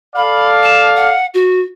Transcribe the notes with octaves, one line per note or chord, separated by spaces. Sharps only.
A4 D5 F5 B5
A5
F#5
F#4